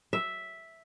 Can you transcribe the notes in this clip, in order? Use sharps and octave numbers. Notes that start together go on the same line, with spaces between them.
E5